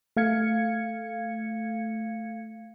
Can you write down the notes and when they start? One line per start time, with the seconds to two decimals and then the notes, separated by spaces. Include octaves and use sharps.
0.16 A3 F5 G#6 C#7